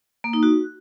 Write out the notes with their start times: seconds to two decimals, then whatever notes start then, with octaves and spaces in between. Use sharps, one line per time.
0.24 A#3
0.33 D#4
0.43 F#4